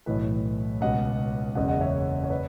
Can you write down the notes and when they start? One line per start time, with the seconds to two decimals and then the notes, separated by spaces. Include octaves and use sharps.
0.06 B1 A2 E3 B4 D#5
0.81 C#2 B2 D#5 F#5
1.55 F#1 E2 C#3 D#5 F#5
1.69 D#5 F#5
1.81 C#5 E5
2.23 C#5
2.30 B4 D#5